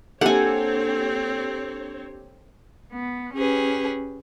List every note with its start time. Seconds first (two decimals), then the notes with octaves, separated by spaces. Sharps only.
0.21 A#3 C4 D4 G4 A4 C#5 F#5 G#5
2.93 B3
3.34 C#4 G4 G#4 B4